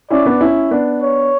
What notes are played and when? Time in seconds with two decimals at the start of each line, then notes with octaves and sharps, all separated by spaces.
0.10 C#4 E4 D5
0.26 B3 D4
0.41 C#4 E4
0.71 B3 D4
1.02 C#5